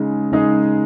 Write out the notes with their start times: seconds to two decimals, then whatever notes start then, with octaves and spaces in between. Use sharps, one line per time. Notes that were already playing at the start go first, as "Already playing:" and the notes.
Already playing: C#3 G#3 D#4 G#4
0.32 C#3 G#3 D#4 G#4